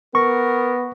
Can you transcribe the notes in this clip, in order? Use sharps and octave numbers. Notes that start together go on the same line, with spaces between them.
B3 A#4 C#6